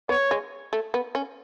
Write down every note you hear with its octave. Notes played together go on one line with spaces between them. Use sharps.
B3 C#5
G#3
A3
B3
C#4